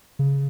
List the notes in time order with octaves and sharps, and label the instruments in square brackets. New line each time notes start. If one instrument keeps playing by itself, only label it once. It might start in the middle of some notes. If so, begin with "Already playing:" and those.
[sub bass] C#3